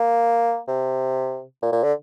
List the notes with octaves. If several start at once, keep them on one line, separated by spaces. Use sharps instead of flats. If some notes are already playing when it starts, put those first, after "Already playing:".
Already playing: A#3
C3
A#2
A#2
D3